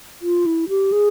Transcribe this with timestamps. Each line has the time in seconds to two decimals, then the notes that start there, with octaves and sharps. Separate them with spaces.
0.22 F4
0.46 E4
0.69 G4
0.92 G#4